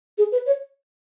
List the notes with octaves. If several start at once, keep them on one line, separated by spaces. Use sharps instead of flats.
G#4
B4
C#5